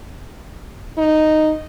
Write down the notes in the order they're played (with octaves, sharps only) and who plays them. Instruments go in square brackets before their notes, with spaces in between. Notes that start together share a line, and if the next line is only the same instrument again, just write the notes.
[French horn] D#4